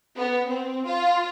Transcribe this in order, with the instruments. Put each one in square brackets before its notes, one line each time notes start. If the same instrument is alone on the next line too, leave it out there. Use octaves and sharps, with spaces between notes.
[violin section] B3
C4
F4